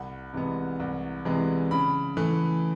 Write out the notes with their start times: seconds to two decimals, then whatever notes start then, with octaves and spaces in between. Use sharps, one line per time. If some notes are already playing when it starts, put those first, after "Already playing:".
Already playing: C2 F#5
0.33 C3 E3 G#3 B3
0.80 C2
1.25 C3 E3 G#3 B3
1.71 C#3 B5
2.17 E3 A3